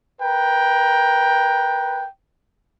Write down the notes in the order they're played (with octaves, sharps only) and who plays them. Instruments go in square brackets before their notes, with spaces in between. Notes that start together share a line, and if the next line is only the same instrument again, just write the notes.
[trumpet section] A#4 B4 G5